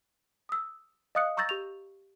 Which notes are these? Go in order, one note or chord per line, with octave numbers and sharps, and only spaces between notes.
D#6 E6
D#5 F5 D#6 F#6 C#7
A#5 C#6 E6 G6 A6 A#6
G4 C#6 F7